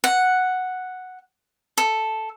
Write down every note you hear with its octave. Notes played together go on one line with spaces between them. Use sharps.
F#5
A4